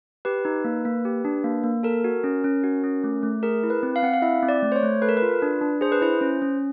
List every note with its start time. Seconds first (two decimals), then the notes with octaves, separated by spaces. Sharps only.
0.25 G4 B4
0.45 D#4
0.65 A#3
0.85 A#3
1.05 G4
1.25 D4
1.44 A#3
1.64 A#3
1.83 A4 A#4
2.04 F#4
2.24 C#4
2.44 C#4
2.64 F#4
2.83 C#4
3.04 A3
3.23 A3
3.43 G#4 A#4
3.63 E4
3.70 B4
3.83 C4
3.96 F5
4.02 C4 F#5
4.13 F5
4.22 E4 E5
4.43 C4
4.49 D5
4.62 A3
4.72 C5
4.76 C#5
4.83 A3
5.02 A4 B4
5.09 A#4
5.17 B4
5.22 F4
5.42 D4
5.61 D4
5.81 G#4 C5
5.92 B4
6.01 E4 C5
6.21 C#4
6.42 C#4